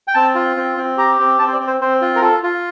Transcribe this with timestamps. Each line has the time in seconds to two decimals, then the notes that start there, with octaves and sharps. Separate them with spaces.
0.08 G5
0.14 C4 A5
0.35 F4
0.56 C4
0.77 C4
0.97 G4 A#5
1.19 C4
1.39 C4 A5
1.47 C5
1.53 D5
1.60 C4
1.67 C5
1.81 C4 C5
2.01 F4
2.16 A#4
2.22 F4 A4
2.43 F4